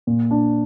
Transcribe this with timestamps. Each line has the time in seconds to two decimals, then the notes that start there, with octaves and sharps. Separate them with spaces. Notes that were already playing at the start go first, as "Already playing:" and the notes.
0.07 A#2
0.31 D4